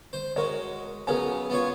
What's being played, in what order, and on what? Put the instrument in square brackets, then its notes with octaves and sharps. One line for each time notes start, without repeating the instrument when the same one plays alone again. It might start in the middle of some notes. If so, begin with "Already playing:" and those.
[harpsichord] C5
[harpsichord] G#3 F#4 [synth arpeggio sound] A#4 C#5
[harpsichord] C#3 F#3 B3 [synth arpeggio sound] G#4 A#4 G#5
[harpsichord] B3 F4 C#5